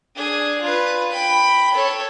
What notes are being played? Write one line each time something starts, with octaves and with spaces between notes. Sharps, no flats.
D4 G#4
F4 B4
G5 B5
A4 C#5